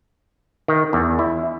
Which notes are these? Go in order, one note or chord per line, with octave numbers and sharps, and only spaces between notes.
D#3
E2
E4